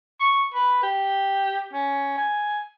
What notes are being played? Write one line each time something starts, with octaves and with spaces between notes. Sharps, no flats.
C#6
B4
G4
C#4
G#5